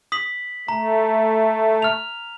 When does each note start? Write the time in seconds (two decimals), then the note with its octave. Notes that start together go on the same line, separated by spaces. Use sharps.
0.12 D#6 B6 F#7
0.68 A3 A#5
1.82 F6 F7